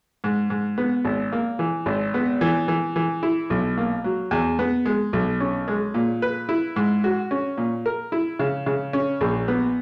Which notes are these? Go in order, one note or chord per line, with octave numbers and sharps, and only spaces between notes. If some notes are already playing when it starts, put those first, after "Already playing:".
G#2
G#2
B3
G#1
A#3
E3
G#1
B3
E3
E3
E3
E4
B1
A#3
F#3
E2
B3
G#3
B1
C#4
G#3
A#2
B4
E4
G#2
F#4
C#4
A#2
A#4
E4
C#3
C#3
C#4
A#1
B3